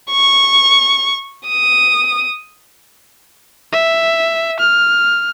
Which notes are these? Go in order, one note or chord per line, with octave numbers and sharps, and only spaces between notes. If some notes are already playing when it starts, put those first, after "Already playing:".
C#6
D#6
E5
F6